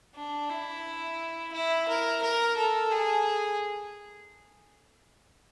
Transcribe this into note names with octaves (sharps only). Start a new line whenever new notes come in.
D4
E4
E4
A#4
A#4
A4
G#4